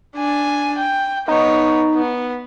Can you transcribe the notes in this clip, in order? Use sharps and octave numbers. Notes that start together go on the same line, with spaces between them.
D4 G#5
G5
B3 D#4 C#5
B3